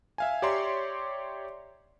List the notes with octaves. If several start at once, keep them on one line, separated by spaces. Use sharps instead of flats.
E5 F5 G#5
G4 C#5 D5 E5 A#5 C6